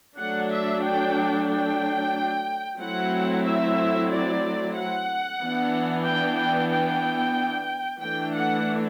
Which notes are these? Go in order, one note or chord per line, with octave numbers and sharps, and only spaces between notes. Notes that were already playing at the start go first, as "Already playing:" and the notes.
F#3 A3 D4 F#5
E5
G5
G5
F#3 A3 C4 E4 F#5
E5
D5
F#5
E3 B3 D4
G5
G5
G5
E3 A3 D4 G5
F#5